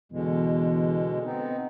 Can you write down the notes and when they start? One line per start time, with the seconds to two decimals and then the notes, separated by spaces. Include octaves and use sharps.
0.12 E2 B2 D3 G#3
1.25 B3 C4 D#4